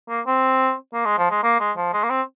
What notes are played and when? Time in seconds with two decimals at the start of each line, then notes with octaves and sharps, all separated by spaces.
0.09 A#3
0.26 C4
0.94 A#3
1.05 G#3
1.18 F3
1.31 G#3
1.43 A#3
1.60 G#3
1.77 F3
1.93 G#3
2.04 A#3
2.10 C4